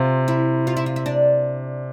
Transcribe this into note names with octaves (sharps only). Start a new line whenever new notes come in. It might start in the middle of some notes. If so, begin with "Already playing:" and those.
Already playing: C3 F4
E4
F4
E4
F4
E4
D4